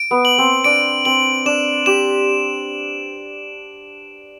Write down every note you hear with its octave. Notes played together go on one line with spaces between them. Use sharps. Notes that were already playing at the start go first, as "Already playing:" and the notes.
Already playing: D7
B3
F#7
C4
D4 D7
C4 F#7
D4 E7
G4 E7